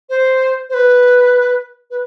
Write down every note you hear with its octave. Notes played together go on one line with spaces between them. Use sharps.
C5
C5
B4
B4